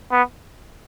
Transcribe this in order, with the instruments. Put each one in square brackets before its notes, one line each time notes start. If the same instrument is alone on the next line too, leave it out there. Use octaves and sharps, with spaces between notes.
[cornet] B3